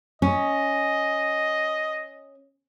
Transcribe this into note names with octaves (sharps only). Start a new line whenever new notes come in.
C#4 D#5